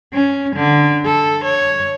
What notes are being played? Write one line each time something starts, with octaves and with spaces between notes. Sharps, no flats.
C#4
D3
A4
C#5